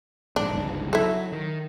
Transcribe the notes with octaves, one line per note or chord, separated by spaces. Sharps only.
A#1 G#2 D4
G1 C#2 G#2
F#3 E4 A4
D#3